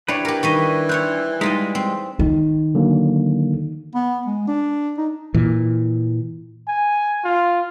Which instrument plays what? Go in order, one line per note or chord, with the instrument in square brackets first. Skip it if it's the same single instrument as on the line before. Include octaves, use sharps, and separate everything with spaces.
[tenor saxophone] E3 [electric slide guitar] D4 B4 [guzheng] G4 C#5
[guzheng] G4 A#4
[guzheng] D#3 G3 D#5 [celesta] C#6 B6
[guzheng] C4 E4 C#5 [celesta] F#6 G6
[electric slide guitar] G3 G#3 [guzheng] D#4 F4 D#5 [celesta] B6
[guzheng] C4
[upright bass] D#3
[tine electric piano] D3 F#3 A#3
[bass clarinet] B3
G#3
D4
D#4
[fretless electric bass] A#2 E3
[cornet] G#5
F4